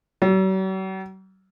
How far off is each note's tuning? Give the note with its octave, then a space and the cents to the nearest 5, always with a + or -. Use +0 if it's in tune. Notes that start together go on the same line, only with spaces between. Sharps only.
F#3 +45